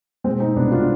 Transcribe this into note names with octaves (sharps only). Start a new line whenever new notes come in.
B2 G#3 C4
C4 D#4
C2 B3 D4
D4 F4